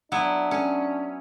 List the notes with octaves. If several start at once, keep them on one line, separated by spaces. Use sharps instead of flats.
F#3 B3 D4 E4
C#4